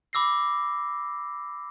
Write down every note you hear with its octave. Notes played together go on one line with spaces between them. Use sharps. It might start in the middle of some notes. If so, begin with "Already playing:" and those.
B5 D6 E6 A#6 C7